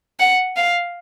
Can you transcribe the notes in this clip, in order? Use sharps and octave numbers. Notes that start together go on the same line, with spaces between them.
F#5
F5